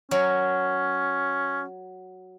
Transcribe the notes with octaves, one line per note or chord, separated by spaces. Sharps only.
F#3 C#4 A#4